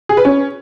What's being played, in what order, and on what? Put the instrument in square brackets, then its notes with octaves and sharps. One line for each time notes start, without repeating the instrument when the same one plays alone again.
[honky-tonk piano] G#4
B4
C#4